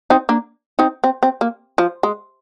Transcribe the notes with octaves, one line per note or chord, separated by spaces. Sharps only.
C4 D#4
A#3 D4
C4 D#4
C4
C4
A#3
F3
G#3